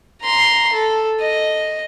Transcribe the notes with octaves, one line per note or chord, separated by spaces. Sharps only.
A#5 C6
A4
D#5